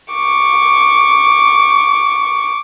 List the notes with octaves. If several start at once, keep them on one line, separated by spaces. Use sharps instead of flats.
C#6 D6